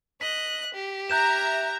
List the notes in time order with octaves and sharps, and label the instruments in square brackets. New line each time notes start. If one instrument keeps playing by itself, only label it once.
[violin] D#5 F#6 [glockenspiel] B6
[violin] G4
[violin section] E5 A#5 [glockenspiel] F#6 G6 E7